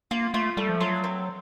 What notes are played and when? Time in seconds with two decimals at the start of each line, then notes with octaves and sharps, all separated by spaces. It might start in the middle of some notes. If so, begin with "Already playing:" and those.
0.11 A#3 F4
0.34 A3 F4
0.57 G3 A3
0.69 F3
0.80 F#3 F4
1.04 C4